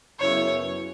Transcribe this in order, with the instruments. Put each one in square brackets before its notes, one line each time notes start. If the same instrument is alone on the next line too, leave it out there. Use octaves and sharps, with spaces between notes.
[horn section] F#2 C#3 F#3 B3 E4 [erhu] C#5